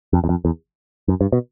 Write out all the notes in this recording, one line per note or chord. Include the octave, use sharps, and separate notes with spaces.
F2
E2
F2
E2
F#2
G2
B2